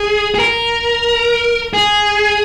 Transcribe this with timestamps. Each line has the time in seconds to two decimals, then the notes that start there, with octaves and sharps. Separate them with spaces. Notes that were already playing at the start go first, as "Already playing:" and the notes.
Already playing: G#4
0.35 G#4
0.40 A#4
1.74 G#4